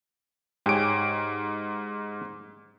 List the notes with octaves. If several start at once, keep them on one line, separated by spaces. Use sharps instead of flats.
G#2 G4 G#4 C#5 D7